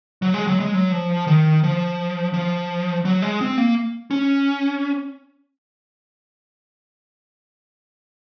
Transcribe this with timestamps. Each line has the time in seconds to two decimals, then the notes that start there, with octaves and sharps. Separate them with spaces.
0.22 F#3
0.34 G#3
0.47 F#3
0.60 G#3
0.74 F#3
0.92 F3
1.27 D#3
1.63 F3
2.34 F3
3.05 F#3
3.22 G#3
3.41 C4
3.57 A#3
4.11 C#4